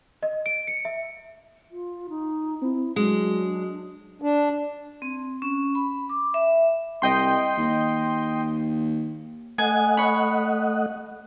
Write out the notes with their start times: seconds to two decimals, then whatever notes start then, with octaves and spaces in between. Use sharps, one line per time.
0.23 D#5
0.46 D7
0.67 C#7
0.85 E5
1.71 F4
2.09 D#4
2.62 C4 E4
2.96 F#3 G#3 D4
4.22 D4
5.02 C4
5.42 C#4
5.75 B5
6.09 D6
6.34 E5
7.02 C2 D#5 G5 C6
7.58 D#2
9.58 A3 D#5 F#5 G#5
9.97 C#5 B5